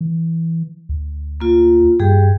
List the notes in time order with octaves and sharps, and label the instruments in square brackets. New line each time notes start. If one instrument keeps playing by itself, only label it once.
[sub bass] E3
D2
[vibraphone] A#3 F4
[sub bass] G2 [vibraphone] G3 G4 G#4